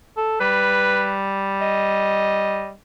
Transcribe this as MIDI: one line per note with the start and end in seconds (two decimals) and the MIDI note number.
0.17 0.38 69
0.40 2.73 55
0.40 1.13 71
1.61 2.71 75